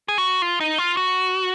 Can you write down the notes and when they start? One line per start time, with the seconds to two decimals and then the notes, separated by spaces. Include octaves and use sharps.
0.08 G#4
0.18 F#4
0.42 F4
0.60 D#4
0.78 F4
0.97 F#4